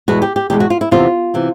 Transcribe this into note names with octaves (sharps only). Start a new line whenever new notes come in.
E2 B2 G#3 B3 F#4
G4
G4
E2 B2 G#3 B3 G4
F#4
F4
E4
E2 C3 E3 F4
C3 E3